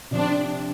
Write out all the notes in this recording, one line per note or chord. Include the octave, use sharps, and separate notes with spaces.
C3 F3 C4 D4